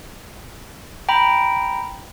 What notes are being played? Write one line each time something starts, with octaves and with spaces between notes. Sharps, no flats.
G5 A#5 B5